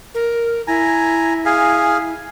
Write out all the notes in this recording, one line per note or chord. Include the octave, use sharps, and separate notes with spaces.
A#4
E4 G#5 A#5
G#4 F5 G#5